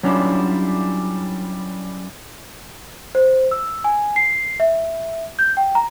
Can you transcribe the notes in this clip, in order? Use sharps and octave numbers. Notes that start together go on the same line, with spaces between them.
F#3 G3 C#4 D4 E4 F4
C5
E6
G#5
C7
E5
G6
G5
A#5